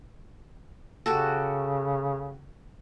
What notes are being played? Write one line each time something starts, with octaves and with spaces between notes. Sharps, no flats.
C#3 F#4 G4 A4